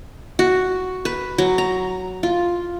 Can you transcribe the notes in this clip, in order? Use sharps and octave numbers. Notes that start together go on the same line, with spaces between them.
F#4
B4
F#3
A#5
F4